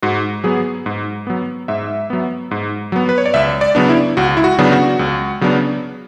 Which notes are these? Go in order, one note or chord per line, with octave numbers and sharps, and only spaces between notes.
G#2 F#4
F#3 B3 G#4
G#2
F#3 B3
G#2 E5
F#3 B3
G#2
F#3 B3
B4
C#5
D5
C#2 E5
D5
C#3 F#3 B3 D4
E4
C#2 F#4
E4
F#4
C#3 F#3 B3 D4
F#4
C#2
C#3 F#3 B3 D4